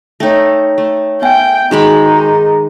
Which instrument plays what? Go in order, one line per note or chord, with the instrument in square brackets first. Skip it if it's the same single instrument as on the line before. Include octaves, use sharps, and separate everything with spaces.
[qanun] A3 D#4 [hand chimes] C#5 G5 A#6
[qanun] A3
[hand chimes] B3 E5 G#5 [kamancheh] G5
[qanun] D#3 G#3 B5 [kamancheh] D#4 [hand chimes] F#4 G#4
[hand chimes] G#4